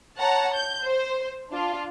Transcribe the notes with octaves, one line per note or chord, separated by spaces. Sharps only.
C#5 F#5 A5 A#5
G6
C5
D4 F4